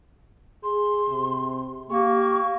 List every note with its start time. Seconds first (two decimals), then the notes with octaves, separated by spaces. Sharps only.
0.63 G#4 C6
1.08 C3
1.90 A#3 G4 C#6